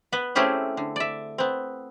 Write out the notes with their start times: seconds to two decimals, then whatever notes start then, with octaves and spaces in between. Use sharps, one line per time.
0.12 B3 B4
0.35 A3 C4 C#4 E4 G4 G#4
0.77 D3
0.96 D5 E5
1.38 B3 C4